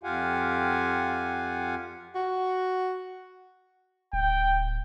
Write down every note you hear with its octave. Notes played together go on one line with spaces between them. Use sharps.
F2 F4 G4 F5 F#5 G#5
F#4
D1 G5